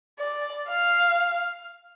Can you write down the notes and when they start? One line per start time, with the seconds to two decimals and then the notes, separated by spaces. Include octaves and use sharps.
0.19 D5
0.69 F5